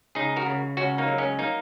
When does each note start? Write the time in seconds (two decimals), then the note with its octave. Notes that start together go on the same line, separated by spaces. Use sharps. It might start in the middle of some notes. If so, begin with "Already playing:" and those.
0.15 C#2 D#4 G#4
0.36 F#4 A#4
0.46 C#3
0.77 C#2 C#4 F#4
0.98 A#3 D#4
1.08 F#3
1.18 G#3 C#4
1.39 A#3 D#4